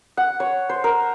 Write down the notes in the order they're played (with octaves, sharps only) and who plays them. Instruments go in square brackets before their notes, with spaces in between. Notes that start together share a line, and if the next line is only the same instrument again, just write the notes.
[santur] F#5
C#5
C5
A#4